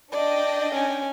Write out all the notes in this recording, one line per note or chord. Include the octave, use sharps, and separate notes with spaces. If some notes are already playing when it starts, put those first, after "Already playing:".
D4 D5 D#5 G5
C#4 G#5